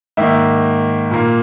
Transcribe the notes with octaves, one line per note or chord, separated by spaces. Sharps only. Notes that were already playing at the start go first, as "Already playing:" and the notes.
G#2 D#3 A#3 E5
A#2 A#3